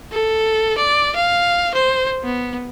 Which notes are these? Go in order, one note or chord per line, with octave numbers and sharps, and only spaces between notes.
A4
D5
F5
C5
B3